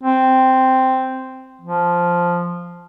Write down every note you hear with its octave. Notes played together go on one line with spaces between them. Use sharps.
C4
F3